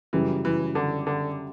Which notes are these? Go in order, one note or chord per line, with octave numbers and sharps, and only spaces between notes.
F#2 C#3 E3 G3
E3
D3
D3